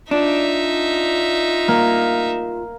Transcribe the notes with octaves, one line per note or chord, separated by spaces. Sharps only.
D4 D#4 F4 E5
A#3